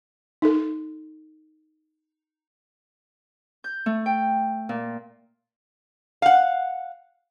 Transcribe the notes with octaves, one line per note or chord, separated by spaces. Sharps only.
D#4 A4
G6
A3
G5
A#2
F5 F#5